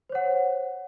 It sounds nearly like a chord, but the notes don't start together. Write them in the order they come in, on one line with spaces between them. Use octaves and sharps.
C5 C#5 F#5